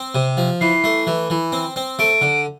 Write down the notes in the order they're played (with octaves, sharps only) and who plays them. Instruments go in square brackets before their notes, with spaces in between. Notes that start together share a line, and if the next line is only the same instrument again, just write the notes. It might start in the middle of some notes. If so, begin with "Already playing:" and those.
Already playing: [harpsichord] C4
C3
F3
[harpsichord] E3 [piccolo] C7
[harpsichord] A3
E3
E3
C4
C4
[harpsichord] A3 [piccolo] D7
[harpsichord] D3